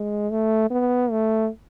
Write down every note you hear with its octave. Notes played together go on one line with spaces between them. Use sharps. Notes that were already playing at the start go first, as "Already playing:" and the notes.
Already playing: G#3
A3
B3
A3